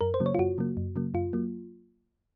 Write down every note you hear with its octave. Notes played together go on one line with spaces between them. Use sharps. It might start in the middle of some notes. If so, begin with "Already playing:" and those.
F#2 A#4
C5
C#3 F#3 A#3
C#5
F4
F#2 F#4
C#3 F#3 A#3
F#2
C#3 F#3 A#3
F#2 F4
F#3 A#3